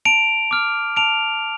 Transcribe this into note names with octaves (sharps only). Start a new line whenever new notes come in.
A5 D7 F7
D6 F6
A5 D7 F7